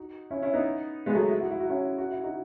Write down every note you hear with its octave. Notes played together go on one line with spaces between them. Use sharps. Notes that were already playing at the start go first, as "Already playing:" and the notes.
Already playing: D#4 F#4
C#4 E4
C#4 E4
B3 D#4
G#3 B3
F#3 A3
E4
F#4
E4
F#4
C#4 E4
F#4
E4
D#4 F#4